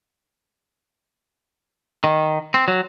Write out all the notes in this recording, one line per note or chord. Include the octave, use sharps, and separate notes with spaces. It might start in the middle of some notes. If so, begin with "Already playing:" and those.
D#3
C4
F#3